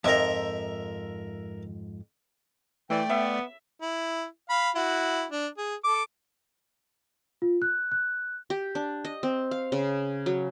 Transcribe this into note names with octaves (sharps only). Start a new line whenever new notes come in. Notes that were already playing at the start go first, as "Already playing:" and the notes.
F2 G#2 A#4 E5
E3 A3 D5 G5
B3 E5
E4
F5 B5
E4 F#4
D4
G#4
A4 D6
F4
F#6
F#6
G4
D4
D#5
C4
F5
C#3
F#3